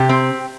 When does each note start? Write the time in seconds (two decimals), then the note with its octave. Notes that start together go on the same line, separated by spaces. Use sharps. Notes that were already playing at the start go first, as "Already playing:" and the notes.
Already playing: C3 G4
0.09 C4